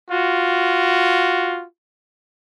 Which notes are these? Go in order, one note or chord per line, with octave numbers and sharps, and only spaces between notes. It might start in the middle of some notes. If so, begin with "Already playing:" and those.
F4 F#4